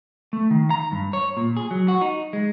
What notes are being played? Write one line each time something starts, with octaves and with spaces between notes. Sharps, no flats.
A3
D#3
A#5
G2
C#5
A#2
G#4
F#3
F#4
D#4
G#3